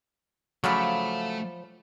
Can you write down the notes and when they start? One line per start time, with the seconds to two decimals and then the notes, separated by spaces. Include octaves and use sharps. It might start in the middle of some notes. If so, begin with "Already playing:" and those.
0.64 C#3 F3 F#3 A3 D5 F5 B5